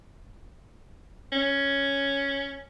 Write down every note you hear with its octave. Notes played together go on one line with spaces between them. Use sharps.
C#4